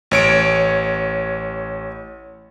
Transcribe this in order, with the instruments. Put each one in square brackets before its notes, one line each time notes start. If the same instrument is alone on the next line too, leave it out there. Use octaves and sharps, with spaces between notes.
[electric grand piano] A1 C#5 D7